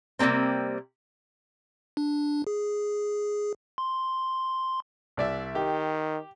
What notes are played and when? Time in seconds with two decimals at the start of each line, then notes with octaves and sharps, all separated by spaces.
0.19 C3 E3 G3 A#3 C4
1.97 D4
2.47 G#4
3.78 C6
5.17 C2 D5 E5
5.55 D#3 G4